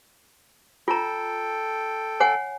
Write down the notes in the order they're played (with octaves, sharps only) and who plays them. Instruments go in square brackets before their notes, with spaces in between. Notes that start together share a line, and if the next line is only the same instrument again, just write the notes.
[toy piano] F4 A#5 [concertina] A4 G5
[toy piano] C#5 F#5 G#5